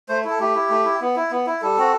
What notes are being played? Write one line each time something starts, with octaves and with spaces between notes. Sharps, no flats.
A3 C5
E4
A4
A3 G4
E4
A3
E4
B3
E4
B3
E4
G3 A4
C4 F#4